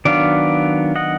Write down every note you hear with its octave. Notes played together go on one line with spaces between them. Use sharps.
D#3 F#3 B3 D4 D5 F5
D#5 F#5